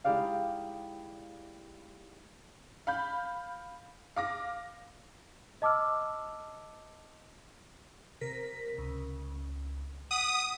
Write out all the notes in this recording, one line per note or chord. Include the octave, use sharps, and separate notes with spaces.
G#3 D#4 E4 G4 D5 F5
F5 B5 G6
F5 D6 A#6
D#5 A5 D6 E6 F6
C3 A#4 B6
C#2
F#5 D#6 B6